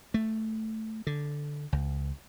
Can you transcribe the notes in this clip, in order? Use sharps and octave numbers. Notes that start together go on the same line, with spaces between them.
A3
D3
C#2